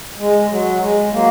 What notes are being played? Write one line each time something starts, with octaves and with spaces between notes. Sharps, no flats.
G#3
F#3
G#3
F#3 A#3